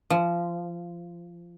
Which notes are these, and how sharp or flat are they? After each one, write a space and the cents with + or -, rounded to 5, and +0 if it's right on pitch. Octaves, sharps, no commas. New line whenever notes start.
F3 -20